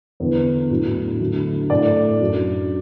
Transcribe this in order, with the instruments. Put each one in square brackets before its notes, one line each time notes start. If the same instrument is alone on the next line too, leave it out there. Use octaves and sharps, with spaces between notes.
[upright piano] E2 D3 B3
A2 F#3 D4
D3 F#3 A3 D4
A2 A3 D4 D5
F#2 F#3 D4